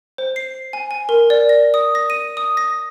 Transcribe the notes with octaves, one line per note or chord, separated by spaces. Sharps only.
C5
C7
G#5
G#5
A#4
D5
A#6
D#6
A#6
D#7
D#6
A#6